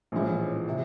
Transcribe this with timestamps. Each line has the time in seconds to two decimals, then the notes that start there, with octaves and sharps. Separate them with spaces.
0.12 A#1 A2 E3 G#3 C#4
0.69 C3